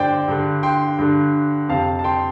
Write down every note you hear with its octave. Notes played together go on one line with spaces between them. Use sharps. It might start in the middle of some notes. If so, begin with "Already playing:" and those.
Already playing: G2 D3 C5 D5 G5
G2 D3
G5 C6
G2 D3
F2 C3 F5 A5
A5
G5 C6